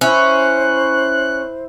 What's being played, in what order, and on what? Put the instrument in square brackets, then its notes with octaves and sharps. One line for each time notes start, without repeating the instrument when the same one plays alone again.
[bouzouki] C#4 [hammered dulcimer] E4 [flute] C5 [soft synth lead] F#6